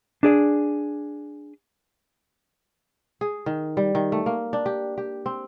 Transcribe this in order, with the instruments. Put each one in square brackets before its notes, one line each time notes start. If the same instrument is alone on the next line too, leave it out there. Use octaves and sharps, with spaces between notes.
[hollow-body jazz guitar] D4 G#4 D5
[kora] G#4
D#3
G3
D#3
A3
A#3
D4
G4
G4
C4